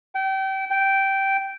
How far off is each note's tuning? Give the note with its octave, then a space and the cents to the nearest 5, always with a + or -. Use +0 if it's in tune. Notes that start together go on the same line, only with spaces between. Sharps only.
G5 -30
G5 -10